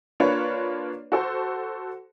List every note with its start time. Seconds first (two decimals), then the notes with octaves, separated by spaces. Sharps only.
0.20 A#3 D4 F4 B4 C#5
1.12 F#4 A4 C5